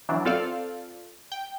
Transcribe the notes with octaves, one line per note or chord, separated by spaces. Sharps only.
E3 F#3 D4
C4 F4 A4 D5 F5
G5